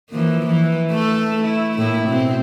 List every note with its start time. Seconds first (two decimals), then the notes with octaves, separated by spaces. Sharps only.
0.10 E3 F3 A#3
0.47 E3
0.92 A3 A4
1.43 E4
1.78 A2 A#3 E4
2.08 B2 C4